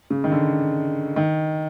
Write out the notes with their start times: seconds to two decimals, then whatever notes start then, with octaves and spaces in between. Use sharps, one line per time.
0.10 C#3
0.24 D#3
0.32 D3
1.16 D#3